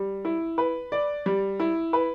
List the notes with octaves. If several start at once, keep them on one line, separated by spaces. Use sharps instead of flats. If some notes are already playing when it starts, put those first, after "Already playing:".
Already playing: G3
E4
B4
D5
G3
E4
B4